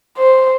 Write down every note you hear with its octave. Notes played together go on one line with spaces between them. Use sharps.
C5